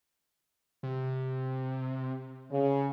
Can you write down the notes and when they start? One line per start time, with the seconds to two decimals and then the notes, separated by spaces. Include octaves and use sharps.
0.83 C3
2.51 C#3